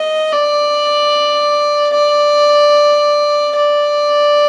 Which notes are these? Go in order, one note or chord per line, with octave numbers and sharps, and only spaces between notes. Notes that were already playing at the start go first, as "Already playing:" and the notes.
Already playing: D#5
D5
D5
D5